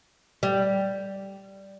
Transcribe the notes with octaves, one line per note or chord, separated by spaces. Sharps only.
G3